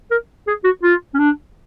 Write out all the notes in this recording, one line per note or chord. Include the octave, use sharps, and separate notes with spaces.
A#4
G#4
F#4
F4
C#4
D4